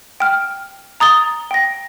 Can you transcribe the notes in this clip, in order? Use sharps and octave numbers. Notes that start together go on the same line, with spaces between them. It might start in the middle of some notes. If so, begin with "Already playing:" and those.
G5 F6
A#5 D#6 A6 G7
G5 A#6